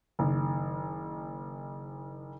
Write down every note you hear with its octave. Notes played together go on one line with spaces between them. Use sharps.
F#1 D#3